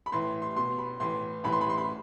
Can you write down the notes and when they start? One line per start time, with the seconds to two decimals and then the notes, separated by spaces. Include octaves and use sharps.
0.06 B5
0.12 A2 E3 C6
0.42 C6
0.56 B2 C6
0.78 B5
1.00 A2 E3 C6
1.44 A2 E3 B5
1.52 C6
1.61 B5
1.69 C6
1.78 B5